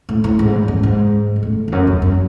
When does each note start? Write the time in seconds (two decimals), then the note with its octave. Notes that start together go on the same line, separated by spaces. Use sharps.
0.09 A2
0.24 A2
0.39 G#2
0.53 E2
0.68 F#2
0.83 G#2
1.36 G#2
1.43 A2
1.68 E2
1.72 F#2
1.87 E2
2.02 F#2